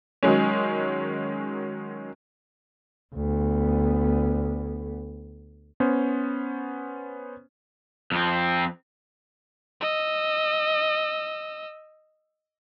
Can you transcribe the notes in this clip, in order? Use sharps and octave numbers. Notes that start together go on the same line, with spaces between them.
D#3 F#3 G#3 C#4
D2 B3
B3 C#4 C5
F2 C4
D#5 E6